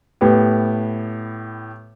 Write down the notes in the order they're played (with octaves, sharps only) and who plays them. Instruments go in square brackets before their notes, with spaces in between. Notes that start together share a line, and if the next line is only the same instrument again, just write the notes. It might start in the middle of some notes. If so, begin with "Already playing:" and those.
[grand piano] A2 B3 G4